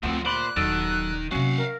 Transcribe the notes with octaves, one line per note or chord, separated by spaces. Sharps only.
D2 F3 F#3 A3 A#3 C4 F#5
A#2 C5 D5 B5 F#6
D#1 D#3 F#3 E4 A4 D5
C3 F#3 A#3 C#4 F#4 F5 F#5
A#4